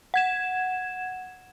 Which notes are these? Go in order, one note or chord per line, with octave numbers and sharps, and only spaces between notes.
F#5 G#6 E7